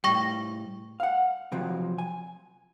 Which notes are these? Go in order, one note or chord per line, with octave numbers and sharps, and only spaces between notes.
A2 G3 G5 C#6 A#6
F5 F#5
C3 F3 F#3
G#5